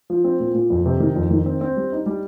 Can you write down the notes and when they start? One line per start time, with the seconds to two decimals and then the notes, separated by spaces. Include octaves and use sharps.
0.10 F3
0.24 C4
0.40 A#2
0.55 A#2
0.70 F2
0.86 C3
1.00 D#3
1.16 F2
1.30 D#3
1.46 C4
1.61 C4
1.77 G3
1.92 D#4
2.06 G3